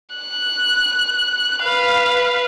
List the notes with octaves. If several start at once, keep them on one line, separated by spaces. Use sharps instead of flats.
F#6
B4 F5